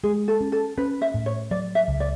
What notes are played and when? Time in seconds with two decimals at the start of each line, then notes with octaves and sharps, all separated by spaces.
0.03 G#3 G#4
0.28 A4
0.41 C#4
0.52 A4
0.77 C#4 B4
1.02 E5
1.14 A2
1.26 C#5
1.51 F#3 D5
1.75 E5
1.88 C#2
2.00 D5